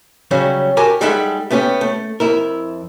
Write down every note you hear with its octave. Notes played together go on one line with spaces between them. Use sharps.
C#3 F#3 G3 C#4
F#4 G4 A#4 G#5 A5
G3 G#3 D#4 A4 E5 F#5
A3 B3 C#4 G4
A3
F2 E4 A#4